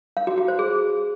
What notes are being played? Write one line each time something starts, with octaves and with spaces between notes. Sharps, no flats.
F5
F#4
F#4
C5
G#4